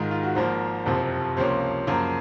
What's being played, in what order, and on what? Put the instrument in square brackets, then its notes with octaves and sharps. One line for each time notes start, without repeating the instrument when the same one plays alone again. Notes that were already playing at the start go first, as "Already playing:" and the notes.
Already playing: [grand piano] G#2 D#3 G#3 F4
F4
F#4
G#1 G#2 F3 A#3 C5
F#1 F2 C3 F3 C4
C#2 C3 F3 A#3 C#4 C5
F#2 C#3 F3 A#3